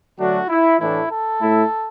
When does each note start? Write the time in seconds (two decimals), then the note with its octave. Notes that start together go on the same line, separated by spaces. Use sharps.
0.18 D3 F#3 A3 D4 F#4
0.49 E4
0.80 A2 E3 A3 D4 E4
1.10 A4
1.41 A2 A3 E4